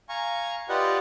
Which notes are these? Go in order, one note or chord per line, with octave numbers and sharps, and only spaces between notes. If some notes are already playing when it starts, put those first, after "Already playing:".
F5 G#5 A#5 C#6
F4 G4 B4 D5 D#5 F#5